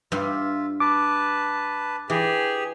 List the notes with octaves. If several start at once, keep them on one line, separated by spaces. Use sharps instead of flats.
G2 G3 F4 E5
B4 A5 D6
E3 G4 G#4